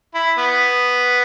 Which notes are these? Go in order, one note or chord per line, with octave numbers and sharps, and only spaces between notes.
E4
B3